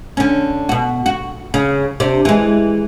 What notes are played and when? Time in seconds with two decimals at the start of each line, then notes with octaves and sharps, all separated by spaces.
0.17 D3 C#4
0.69 B2 F#4
1.06 F#4
1.54 C#3
2.00 C3 D4
2.25 E3 G#3